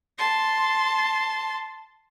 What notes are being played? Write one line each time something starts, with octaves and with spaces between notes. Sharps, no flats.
A5 C6